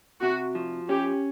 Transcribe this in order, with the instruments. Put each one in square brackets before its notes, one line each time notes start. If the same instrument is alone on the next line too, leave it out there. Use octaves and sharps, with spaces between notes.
[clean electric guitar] C3 [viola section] F#4
[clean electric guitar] F3
[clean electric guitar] C#4 [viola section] G4